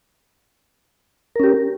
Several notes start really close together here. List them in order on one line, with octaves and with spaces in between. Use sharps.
A#4 C#4 G4